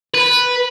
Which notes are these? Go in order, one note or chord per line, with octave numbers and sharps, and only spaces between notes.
B4